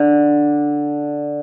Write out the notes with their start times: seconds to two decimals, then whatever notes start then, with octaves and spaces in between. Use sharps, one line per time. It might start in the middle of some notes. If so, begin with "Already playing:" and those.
Already playing: D3